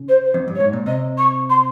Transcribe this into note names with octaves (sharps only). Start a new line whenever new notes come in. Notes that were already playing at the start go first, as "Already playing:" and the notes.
Already playing: C#3
C5
C5
F2
G2
C#5
G#2
A#2
C3 D#5
C#6
C6